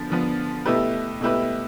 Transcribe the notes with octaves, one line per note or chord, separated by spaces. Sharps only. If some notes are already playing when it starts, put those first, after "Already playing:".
Already playing: D3 F3 B3
D3 F3 B3
B2 A3 E4 G4 B4
B2 A3 E4 G4 B4